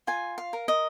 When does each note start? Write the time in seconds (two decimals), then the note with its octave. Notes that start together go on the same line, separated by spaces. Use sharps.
0.07 F4 G#5
0.38 F5
0.53 A#4
0.68 D#5